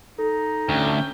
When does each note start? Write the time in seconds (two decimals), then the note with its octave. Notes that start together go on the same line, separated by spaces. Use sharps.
0.19 D#4 A4
0.69 D2 C#4 G5